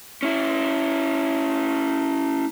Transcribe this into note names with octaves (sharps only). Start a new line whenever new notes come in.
C#4 E4